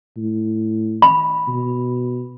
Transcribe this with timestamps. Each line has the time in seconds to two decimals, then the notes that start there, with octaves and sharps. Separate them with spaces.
0.17 A2
1.02 B5
1.48 B2